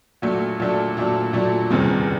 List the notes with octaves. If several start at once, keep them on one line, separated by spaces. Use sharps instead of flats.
A#2 F#3 A3 D4
A#2 F#3 A3 D4
A#2 F#3 A3 D4
A#2 F#3 A3 D4
F#1 E2 C3 D#3 G3